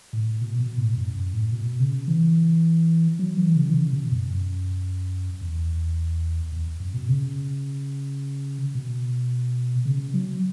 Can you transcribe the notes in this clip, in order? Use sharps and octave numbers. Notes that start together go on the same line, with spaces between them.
A2
B2
B2
A2
F#2
F#2
A2
B2
C#3
E3
F#3
E3
C#3
E3
C#3
B2
F#2
F#2
E2
E2
F#2
B2
C#3
B2
C#3
F#3